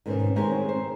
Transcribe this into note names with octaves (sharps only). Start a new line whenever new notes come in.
G#2 B2 D#3 C4 C#4
D#3 G#3 C4 G4 C5 C#5
C5